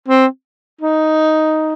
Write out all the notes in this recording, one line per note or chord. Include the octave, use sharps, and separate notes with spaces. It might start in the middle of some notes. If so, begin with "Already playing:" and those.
C4
D#4